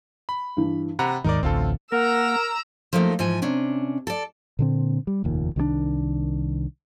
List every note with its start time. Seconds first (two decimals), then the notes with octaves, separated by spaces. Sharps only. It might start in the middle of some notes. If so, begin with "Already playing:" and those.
0.29 B5
0.57 G2 E3
0.99 C3 F#5 A#5 B5
1.24 D#2 G#2 D#3 D#4 A#4 D5
1.43 A1 D2 C4 F4 A4
1.92 A#3 A#4 F#5 A#5 E6
2.93 F3 F#3 A3 A#3 D#4
3.19 G#2 E3 F3 G#5
3.42 C3 C#4 D4
4.07 A4 D5
4.59 A#2 D3 C4
5.07 G3
5.24 F1 D#2 A#2
5.56 C2 D#3 F3 D4